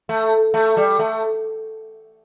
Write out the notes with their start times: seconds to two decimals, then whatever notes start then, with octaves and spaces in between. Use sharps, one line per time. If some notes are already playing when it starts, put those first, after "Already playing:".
0.09 A3
0.54 A3
0.77 G3
0.99 A3